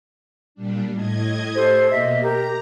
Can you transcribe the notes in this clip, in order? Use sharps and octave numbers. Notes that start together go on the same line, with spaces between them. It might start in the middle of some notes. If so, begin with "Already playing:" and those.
A#2 G3 D4
A2 D#5 G#6
G4 A4 C5
B2 A#3 D#5 E5
G4 A#4 A#5